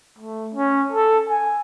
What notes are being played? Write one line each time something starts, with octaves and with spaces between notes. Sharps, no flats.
A3
C#4
A4
G#5